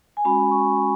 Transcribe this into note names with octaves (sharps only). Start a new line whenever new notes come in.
G#5
G#3 C#4 F#4 B5
C#6
C#6